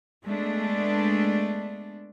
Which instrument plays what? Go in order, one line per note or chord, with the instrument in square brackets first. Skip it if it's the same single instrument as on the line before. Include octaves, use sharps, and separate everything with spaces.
[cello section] G#3 A3 B3 D4